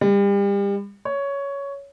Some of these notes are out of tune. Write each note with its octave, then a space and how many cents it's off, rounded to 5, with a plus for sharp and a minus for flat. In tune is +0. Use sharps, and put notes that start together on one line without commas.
G3 +35
C#5 +10